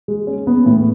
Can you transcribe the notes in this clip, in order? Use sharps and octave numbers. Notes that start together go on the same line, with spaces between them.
G#3
C#4
B3
A2